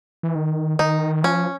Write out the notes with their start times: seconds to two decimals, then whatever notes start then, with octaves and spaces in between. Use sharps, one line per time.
0.23 E3
0.35 D#3
0.79 D#3 D#4
1.24 F3 C#4